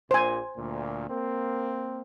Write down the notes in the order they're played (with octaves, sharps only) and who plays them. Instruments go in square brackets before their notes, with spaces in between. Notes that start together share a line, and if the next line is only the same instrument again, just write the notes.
[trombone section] A#1 A#2 [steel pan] C5 G#5
[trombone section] D2 A#2
A#3 C4